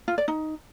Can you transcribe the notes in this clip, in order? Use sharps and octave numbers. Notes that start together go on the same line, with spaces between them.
F4
D5
D#4